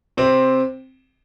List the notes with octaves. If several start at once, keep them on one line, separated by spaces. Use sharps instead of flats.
C3 C4